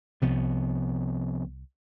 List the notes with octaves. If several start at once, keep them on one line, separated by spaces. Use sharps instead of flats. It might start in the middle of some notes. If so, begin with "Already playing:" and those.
C2 C3 F3 B3